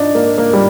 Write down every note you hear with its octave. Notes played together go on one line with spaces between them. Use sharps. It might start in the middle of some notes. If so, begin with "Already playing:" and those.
Already playing: D4 D#4
A#3
A#3
G3